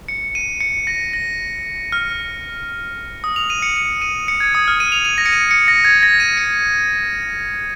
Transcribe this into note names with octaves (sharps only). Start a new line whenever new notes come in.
C#7
D#7
C#7
A#6
A#6
F6
D#6
F7
D#7
C#7
D#7
D#7
C#7
G#6
D#6
F6
D#7
F7
D#7
A#6
C#7
D#7
C#7
A#6
G#6
A#6
D#7
C#7